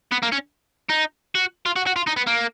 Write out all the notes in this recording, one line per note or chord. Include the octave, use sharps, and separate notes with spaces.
B3
A#3
C#4
D#4
F#4
F4
F#4
F#4
F4
D#4
B3
A#3